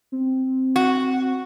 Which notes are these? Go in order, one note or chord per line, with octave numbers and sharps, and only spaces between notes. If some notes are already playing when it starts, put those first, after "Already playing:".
C4
F#4